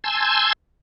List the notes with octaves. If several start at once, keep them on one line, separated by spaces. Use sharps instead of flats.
G#5 A5 C6 E6 G6 G#6